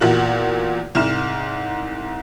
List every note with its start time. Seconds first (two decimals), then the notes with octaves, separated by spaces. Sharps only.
0.01 E2 A#2 F#4 F#7
0.95 C2 G#2 F6 E7